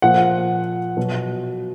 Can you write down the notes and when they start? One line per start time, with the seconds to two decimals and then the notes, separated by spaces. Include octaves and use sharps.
0.02 A#2 F3 F#5
0.97 B2 F#3